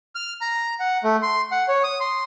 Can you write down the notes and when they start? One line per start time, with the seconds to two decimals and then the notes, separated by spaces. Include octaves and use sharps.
0.15 F6
0.41 A#5
0.80 F#5
1.04 A3
1.22 C6
1.52 F#5
1.68 C#5
1.84 D#6
2.00 C6